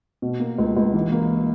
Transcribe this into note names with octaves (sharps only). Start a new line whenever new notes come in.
B2
A#3
C#2
C#2
E3
A#3